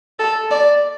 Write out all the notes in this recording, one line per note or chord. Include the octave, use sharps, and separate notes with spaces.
A4
D5